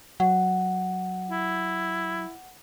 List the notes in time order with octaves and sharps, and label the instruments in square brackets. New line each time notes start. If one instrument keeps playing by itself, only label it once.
[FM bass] F#3 [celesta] F#5
[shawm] E4